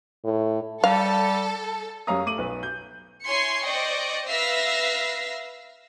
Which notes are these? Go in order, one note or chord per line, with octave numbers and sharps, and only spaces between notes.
A2
G3 A4 F5
F#2 G3 C#5 F5 A#5 D#6
A3 D6 D#7 F#7
B1 B4
G6
E4 C#5 G#5 C6 C7 C#7
C5 D5 D#5 G5 C#6
B4 E5 F5 E6 A#6 C7